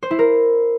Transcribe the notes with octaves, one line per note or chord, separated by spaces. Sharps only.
C5
E4
A#4